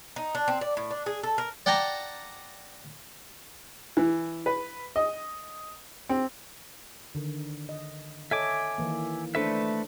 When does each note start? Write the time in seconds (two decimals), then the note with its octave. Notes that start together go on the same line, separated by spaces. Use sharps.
0.16 D#4
0.35 D4
0.48 C4
0.61 D5
0.77 A2
0.91 D4
1.06 G#4
1.23 A4
1.38 A#4
1.66 D5 F#5 G5 A5 A#5
3.97 E3
4.46 B4
4.96 D#5
6.09 C4
7.15 D3 D#3
7.69 D#5
8.31 A4 C#5 D#5 E5 G#5 D6
8.78 D#3 E3 A#3
9.35 A3 D4 A4 B4 C5 E5